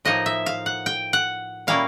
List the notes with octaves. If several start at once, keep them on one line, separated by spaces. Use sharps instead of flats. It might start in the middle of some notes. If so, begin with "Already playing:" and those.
A2 F3 A#3 D#4 D#5
E5
F5
F#5
G5
F#5
A#2 G3 A#3 C#4 E4 F5